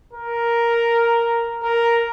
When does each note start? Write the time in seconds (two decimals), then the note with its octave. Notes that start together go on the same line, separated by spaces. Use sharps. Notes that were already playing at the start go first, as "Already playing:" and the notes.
0.13 A#4
1.63 A#4